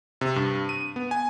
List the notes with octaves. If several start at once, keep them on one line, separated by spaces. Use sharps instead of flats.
C3
G2
D#7
B3
G#5